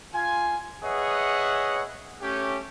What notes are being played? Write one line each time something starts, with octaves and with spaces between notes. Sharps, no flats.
F4 G#5
G#4 B4 C#5 D#5 E5 F#5
A3 C#4 G4